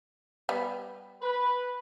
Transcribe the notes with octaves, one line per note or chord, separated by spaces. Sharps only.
G3 B3
B4